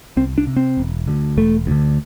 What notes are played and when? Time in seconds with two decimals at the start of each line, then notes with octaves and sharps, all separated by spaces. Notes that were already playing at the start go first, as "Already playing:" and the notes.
0.17 C2 C4
0.38 D4
0.47 C3
0.56 C4
0.77 E1
1.07 D2 D3
1.37 E1 A3
1.67 D2 D3